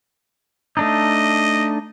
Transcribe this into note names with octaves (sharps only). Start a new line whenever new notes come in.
A3 D4 D#4 D#5